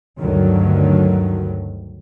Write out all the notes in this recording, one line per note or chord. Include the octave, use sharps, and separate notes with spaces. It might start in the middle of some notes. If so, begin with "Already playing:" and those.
D2 G2 D3 D#3 F#3